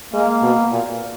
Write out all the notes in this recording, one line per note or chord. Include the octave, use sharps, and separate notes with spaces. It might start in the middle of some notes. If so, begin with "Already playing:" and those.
G#3 A#3
B2
A#2